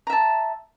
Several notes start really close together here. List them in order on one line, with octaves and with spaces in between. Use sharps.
A#5 E5 A5